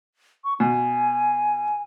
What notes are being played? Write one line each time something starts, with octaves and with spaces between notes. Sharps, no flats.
C#6
B2 G#5